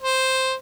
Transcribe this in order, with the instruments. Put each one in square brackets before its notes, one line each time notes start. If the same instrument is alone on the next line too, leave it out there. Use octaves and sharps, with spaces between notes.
[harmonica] C5